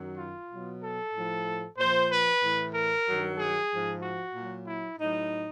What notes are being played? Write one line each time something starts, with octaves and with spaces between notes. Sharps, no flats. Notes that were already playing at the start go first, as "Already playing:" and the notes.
Already playing: F#2 D#3 F#3
F4
B2 F#3
A4
A2 F3
A#2 F3 C5
B4
A2 E3
A#4
G2 D#3 F#3
G#4
G#2 F3
F#4
A#2 F#3
E4
A2 F#3 D#4